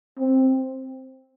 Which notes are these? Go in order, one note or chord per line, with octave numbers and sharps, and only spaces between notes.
C4